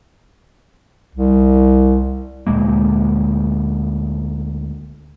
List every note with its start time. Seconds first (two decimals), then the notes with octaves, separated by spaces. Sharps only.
1.15 C2
2.47 D2 A#2 G#3 A#3